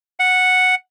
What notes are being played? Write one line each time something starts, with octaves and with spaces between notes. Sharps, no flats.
F#5